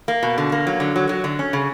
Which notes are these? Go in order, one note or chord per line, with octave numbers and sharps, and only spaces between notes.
A#3
B2
D3
A#3
F#3
D3
F#3
F#3
D3
C#4
C#3